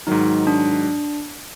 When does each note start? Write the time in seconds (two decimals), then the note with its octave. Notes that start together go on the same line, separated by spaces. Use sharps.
0.07 G#2 D#3 F#3 D#4
0.47 D4